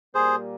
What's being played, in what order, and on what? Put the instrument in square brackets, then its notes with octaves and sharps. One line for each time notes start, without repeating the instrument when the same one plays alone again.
[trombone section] A#2 G3 A#3 [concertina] G#4 C5